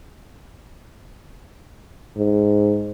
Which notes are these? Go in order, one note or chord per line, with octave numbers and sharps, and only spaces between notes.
G#2